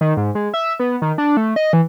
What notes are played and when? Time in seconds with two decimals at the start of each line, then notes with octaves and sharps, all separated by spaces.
0.01 D#3
0.17 G#2
0.35 G#3
0.54 E5
0.80 B3
1.02 D#3
1.18 D4
1.37 A3
1.56 D#5
1.73 E3